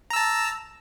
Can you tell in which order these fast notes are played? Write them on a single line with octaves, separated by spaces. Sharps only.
A#5 E6 A5